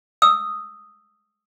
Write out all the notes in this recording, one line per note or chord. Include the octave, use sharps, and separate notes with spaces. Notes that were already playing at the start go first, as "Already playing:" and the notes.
D#6 E6